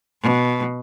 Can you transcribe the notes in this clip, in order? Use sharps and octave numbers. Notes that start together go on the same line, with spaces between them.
B2